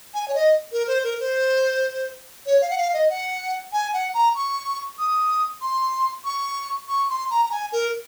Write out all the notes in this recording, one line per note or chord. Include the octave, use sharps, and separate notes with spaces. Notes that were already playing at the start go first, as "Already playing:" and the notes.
G#5
C#5
D#5
A#4
C5
A#4
C5
C#5
F5
F#5
F5
D#5
F#5
G#5
F#5
A#5
C#6
D#6
C6
C#6
C#6
C6
A#5
A#5
G#5
A#4